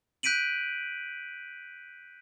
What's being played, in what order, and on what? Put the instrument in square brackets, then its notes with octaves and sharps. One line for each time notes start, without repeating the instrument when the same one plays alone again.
[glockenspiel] F#6 G6 B6 D7 D#7 F#7